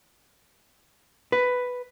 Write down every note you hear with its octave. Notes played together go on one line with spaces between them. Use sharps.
B4